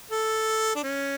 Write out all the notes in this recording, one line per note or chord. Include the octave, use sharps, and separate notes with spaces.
A4
D4
C#4